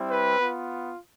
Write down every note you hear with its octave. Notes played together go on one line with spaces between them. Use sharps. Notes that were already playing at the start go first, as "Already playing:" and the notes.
Already playing: G3 C4 E4
B4
B3 F4